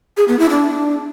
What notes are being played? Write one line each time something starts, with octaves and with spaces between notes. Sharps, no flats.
G#4
B3
E4
D4